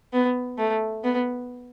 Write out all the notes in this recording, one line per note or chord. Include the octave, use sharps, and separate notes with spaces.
B3
A3
B3